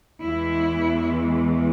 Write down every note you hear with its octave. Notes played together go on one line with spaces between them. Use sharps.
E2 E3 G#3 E4